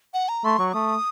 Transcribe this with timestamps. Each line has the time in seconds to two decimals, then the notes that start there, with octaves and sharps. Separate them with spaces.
0.14 F#5
0.29 A#5
0.44 A3 C6
0.59 F#3 C#6
0.74 A3 D#6